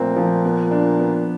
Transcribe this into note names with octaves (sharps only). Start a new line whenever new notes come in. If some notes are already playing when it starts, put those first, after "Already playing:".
Already playing: A#2 F3 A3 C4
F3
B3
D4
B3